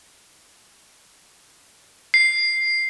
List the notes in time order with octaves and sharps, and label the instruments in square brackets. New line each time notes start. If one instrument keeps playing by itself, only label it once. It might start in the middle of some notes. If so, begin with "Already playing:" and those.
[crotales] C7